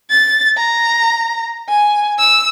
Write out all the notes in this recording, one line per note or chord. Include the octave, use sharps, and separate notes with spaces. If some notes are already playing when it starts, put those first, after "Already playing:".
A6
A#5
G#5
E6